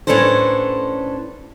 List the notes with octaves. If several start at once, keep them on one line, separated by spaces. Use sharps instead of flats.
A2 C#4 D4 A4 B4 C5